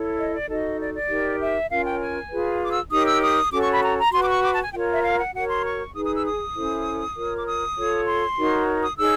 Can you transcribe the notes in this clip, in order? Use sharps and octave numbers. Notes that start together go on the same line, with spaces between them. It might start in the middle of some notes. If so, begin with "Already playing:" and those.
Already playing: E4 A4 C#5
D#5
D5
D#4 F#4 A4 D#5
D5
D5
D#4 G4 A#4
E5
C#4 F4 A#4 C#5 F5
G5
G#5
F4 G#4 B4
D6
E6
D#4 G4 A#4 C#5 D#6
E6
D#6
C#4 F#4 A4 C#5 D6
C#6
B5
A#5
A#5
F#4 B4 C6
D6
C#6
D6
A5
G#5
F4 A#4 C#5 G5
E5
F5
F#5
F#4 A#4 C#5 F#5
C6
C#6
D#4 G#4 B4 D#6
D#6
E6
D#6
C#4 E4 A4 C5
F4 A#4 C#5
D6
D#6
F4 A4 C#5
C6
D#4 F#4 A#4 C#5
D#6
D#4 G#4 C#5 E6